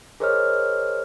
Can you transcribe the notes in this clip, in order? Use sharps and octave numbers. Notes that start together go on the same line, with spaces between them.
G#4 A#4 C5 C#5 D#5 F6